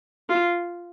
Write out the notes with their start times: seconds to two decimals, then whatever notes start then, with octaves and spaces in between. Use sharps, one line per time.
0.29 F4